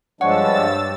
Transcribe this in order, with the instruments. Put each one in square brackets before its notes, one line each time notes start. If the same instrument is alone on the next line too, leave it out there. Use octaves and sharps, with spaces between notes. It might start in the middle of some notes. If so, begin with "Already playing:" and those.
[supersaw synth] G2 E6 A6 [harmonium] F3 G#3 D4 [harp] C#5 [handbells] F#5